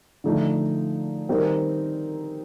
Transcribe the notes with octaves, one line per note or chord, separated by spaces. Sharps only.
D3 F3 A3 D#4
D#3 G3 C4 D#4 A#4